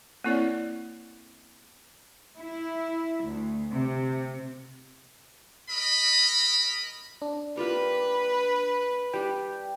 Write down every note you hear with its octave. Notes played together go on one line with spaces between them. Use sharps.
A#3 C4 E4 A4 C#5 D5
E4
D2
C3
A#4 D#5 B5
D4
A#3 F4 G4 B4
G3 D4 G4 G5